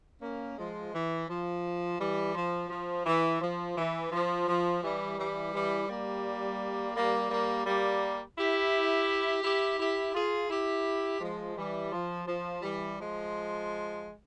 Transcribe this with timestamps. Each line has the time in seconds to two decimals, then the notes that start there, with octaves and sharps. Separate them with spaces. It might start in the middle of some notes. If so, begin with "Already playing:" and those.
0.22 A#3 C#4
0.57 F3 G#3
0.93 E3
1.28 F3
1.99 E3 G3
2.35 F3
2.70 F3
3.06 E3
3.41 F3
3.76 E3
4.12 F3
4.47 F3
4.83 E3 G3
5.18 E3 G3
5.53 E3 G3
5.89 G3 A#3
6.96 G3 A#3
7.31 G3 A#3
7.66 G3 A#3
8.37 E4 G4
9.43 E4 G4
9.79 E4 G4
10.14 F4 G#4
10.50 E4 G4
11.21 F3 G#3
11.57 E3 G3
11.92 F3
12.27 F3
12.62 E3 G3
12.98 F3 G#3